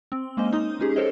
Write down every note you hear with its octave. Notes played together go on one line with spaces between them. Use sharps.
C4
G#3 A#3 C#4 C5 D#5
D#4 D#5 D#6
G#3 C#4 D#4 G4 G#4
A4 A#4 C5 C#5 D#5